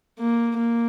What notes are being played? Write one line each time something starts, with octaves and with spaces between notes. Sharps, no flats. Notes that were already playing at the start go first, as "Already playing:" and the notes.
A#3
A#3